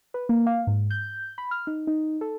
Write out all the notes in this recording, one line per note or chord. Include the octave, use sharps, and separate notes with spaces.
B4
A#3
F5
G#2
G6
B5
F6
D#4
D#4
A4